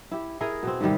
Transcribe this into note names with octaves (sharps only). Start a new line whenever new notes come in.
E4 G4
E4 G#4 A#4 D#5
B2 C4
G#2 C3 D#3 G3